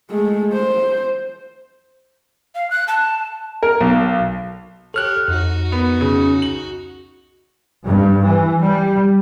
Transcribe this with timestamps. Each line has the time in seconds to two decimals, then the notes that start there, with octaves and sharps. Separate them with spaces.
0.10 G#3 A3
0.53 C5
2.55 F5
2.71 F#6
2.88 A5
3.63 A#4
3.81 B1
4.94 G4 A4 C#5 F6 F#6
5.28 F2 D#4 F#4
5.72 B3
6.01 C#3
6.42 F#7
7.85 G2
8.23 E3
8.59 G3